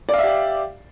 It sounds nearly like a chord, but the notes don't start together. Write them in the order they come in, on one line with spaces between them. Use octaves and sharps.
D5 F5 E5 G4